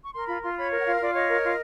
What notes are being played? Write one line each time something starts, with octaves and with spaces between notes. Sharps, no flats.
C#6
A#4 C6
F4 B5
F4 C6
C#5 B5
A#4
F#5
F4 F5
F4 D5
C#5 D#5
A#4
F4